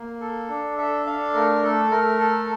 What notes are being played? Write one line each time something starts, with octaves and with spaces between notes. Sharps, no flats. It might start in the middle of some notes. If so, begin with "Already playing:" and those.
Already playing: A#3
A4
D4
A4 E5
D4 F5
A3 A#4
A3 A4
A3 A#4
A4